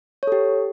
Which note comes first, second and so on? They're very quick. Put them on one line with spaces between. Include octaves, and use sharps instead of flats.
C#5 A4 G4